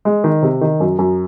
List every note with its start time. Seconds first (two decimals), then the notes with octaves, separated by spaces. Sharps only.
0.05 G#3
0.24 D#3
0.42 C3
0.61 D#3
0.80 F#2
0.99 F#2